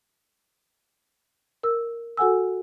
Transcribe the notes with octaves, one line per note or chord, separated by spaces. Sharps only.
A#4 E6
F#4 A4 F#5 G#5 E6